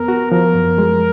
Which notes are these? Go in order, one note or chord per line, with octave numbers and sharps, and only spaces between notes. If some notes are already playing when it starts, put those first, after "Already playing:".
Already playing: F2 B3 A#4
F#4
F3 A#4
F#2
G#3